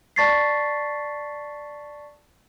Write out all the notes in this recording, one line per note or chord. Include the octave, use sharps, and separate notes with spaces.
D5 A5 C#6 A6 B6 C7